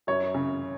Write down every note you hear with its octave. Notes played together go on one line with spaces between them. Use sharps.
F#2 C#5
C#3